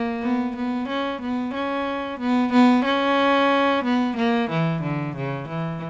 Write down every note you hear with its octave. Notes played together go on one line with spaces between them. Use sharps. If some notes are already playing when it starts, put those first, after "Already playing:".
Already playing: A#3
B3
B3
C#4
B3
C#4
B3
B3
C#4
B3
A#3
E3
D3
C#3
E3